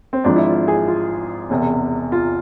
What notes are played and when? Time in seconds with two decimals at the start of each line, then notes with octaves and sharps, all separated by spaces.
0.13 C4
0.24 G#1 G#2 F3 D4
0.36 E4
0.46 F4
0.68 G#4
0.88 F4
1.50 E1 E2 C3
2.12 F4